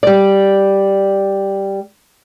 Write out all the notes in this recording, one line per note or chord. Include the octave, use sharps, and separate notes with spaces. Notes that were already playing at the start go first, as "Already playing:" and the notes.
G3 D5